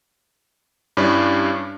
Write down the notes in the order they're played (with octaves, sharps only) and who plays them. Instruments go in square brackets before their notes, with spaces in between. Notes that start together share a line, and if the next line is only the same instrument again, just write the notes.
[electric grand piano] G2 C#4 D4 E4